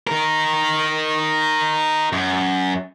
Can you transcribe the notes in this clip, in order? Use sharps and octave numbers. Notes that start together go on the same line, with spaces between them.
D#4 A#4
F#2